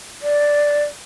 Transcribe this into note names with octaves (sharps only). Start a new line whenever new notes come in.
D5